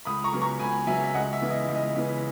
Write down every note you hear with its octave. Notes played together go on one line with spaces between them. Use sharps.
C#2 B5 D#6
A#5 C#6
C#3 F#3 B3
A#5 C#6
C#2 G#5 B5
C#3 F#3 B3 E5 G#5
E5
C#2 D#5 F#5
E5
C#3 E3 B3
D#5
C#2
D#5
C#3 E3 B3